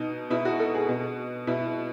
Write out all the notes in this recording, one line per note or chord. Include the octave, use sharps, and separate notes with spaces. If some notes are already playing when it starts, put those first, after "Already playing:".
Already playing: B2 D#4
B2 E4
F#4
A4
G#4
B2
B2 E4